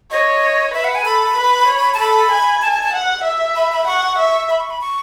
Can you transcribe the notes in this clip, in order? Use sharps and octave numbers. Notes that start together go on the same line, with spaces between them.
C#5 D#5
B4 E5
F#5
G#5
A4 B5
B4
C#5
A5
A4 B5
G#5
A5
A5
A5
F#5
E5
B5
B5
F#5 C#6
E5
B5
C#6
B5
C#6